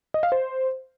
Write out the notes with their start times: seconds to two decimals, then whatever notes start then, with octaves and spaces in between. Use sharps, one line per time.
0.14 D#5
0.23 F5
0.32 C5